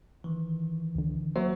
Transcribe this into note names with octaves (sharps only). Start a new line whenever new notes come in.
D#3 E3
C#2 D3
F#3 A#3 C5 C#5 E5